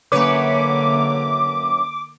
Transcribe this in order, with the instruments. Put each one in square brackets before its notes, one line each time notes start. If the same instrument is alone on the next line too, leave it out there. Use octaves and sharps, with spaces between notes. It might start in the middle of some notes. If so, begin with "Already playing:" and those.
[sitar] F#2 B4 C#5 [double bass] D3 A#3 [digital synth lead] D6